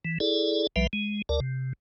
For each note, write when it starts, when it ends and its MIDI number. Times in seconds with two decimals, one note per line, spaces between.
0.05 0.18 52
0.20 0.67 64
0.20 0.67 68
0.20 0.67 69
0.20 0.67 74
0.76 0.87 35
0.76 0.87 53
0.76 0.87 55
0.76 0.87 71
0.76 0.87 76
0.93 1.22 56
1.29 1.40 38
1.29 1.40 70
1.29 1.40 74
1.40 1.73 48